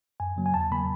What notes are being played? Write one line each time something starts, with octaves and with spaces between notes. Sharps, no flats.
F#2 G#5
C#3 F#3 A#3
G#5
E2 A5
C#3 F#3 A#3 B5